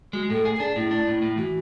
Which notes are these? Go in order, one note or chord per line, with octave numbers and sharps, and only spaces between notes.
G#3 F#4
A2 A4
G#4
A4
D4 G#4
A2 E4
D4
A2
A2
E3 F#4